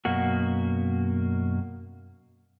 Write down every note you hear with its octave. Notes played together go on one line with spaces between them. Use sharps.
F#2 B2 A#3 F#4